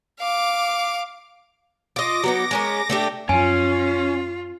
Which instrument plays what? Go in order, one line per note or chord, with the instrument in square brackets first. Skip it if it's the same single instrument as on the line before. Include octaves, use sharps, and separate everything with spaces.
[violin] F5 D6
[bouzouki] F4 D#5 [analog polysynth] D6 A#6
[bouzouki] F#3 B3 D#4
G#3 C#4 A#4
A3 D4 G4
[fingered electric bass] F#2 F3 [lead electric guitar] C#4 [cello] F4 [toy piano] G#5